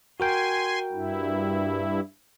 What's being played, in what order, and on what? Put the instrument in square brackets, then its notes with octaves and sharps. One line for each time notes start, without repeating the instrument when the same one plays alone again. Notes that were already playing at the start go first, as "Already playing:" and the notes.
[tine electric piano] F#4 A#4 G5 [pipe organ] G#5 C6
[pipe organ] G2 E4